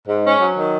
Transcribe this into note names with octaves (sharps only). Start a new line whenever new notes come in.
G#2
C#4
F#3
D#3